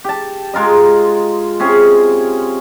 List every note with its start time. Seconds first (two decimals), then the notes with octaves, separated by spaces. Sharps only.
0.04 G4 A5
0.53 G#3 F4 A#4 D#5
1.60 C3 C#4 G#4